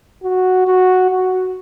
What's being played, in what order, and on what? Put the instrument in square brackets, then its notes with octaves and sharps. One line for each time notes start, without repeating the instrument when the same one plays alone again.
[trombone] F#4
F#4
F#4